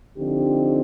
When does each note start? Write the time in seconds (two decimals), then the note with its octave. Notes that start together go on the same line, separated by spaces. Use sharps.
0.18 D3 F3 C4 D#4 G4